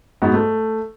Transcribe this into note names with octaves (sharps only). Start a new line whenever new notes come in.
G#2 B3 F#4
A3